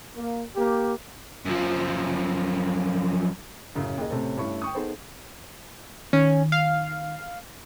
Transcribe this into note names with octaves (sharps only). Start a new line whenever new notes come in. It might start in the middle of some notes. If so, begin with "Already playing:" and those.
A#3
A#3 G4
F#2 F3
A1 F#2 C#3
D#2 G#4 D#5
A2 C3 C4 C#4 A4
G2 A3 C#4 E4 C#6
G5 C#6 D#6
B3 D#4 G#4 A4 C5
D#3 C#4
F5